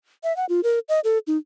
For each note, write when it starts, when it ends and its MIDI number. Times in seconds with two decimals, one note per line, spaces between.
0.24 0.35 76
0.37 0.45 78
0.49 0.61 65
0.63 0.79 70
0.89 1.00 75
1.04 1.18 69
1.27 1.37 63